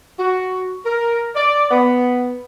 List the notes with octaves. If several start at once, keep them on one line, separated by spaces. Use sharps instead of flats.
F#4
A#4
D5
B3